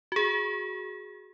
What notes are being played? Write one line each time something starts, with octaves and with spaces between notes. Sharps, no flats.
F#4 G#4